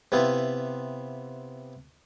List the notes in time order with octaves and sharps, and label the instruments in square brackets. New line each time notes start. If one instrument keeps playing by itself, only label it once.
[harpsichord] C3 B3 E4 F4